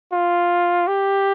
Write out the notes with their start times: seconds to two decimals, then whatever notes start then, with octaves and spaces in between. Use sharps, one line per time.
0.12 F4
0.87 G4